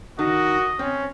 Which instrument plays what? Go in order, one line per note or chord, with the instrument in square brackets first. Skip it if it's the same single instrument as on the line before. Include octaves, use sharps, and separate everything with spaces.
[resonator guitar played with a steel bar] D#3 [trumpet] F#4 [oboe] D#5
[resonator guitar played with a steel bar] C4 [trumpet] C#4